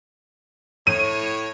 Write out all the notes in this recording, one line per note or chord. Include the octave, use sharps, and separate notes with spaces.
A2 C#5 D#7